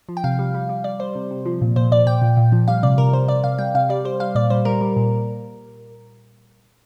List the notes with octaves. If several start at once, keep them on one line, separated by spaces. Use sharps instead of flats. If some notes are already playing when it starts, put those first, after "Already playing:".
F3
G5
C3 F5
G3
G3
G3
G3 D5
G3 C5
C3
C3
F3
A#2
A#2 C5
A#2 D5
A#2 G5
A#2
A#2
F3
G3 F5
C3 D5
C3 A#4
C3 C5
C3 D5
C3 F5
G3 G5
C3 F5
G3 D5
G3 C5
G3 F5
A#2 D5
G3 C5
G3 A#4
G3
A#2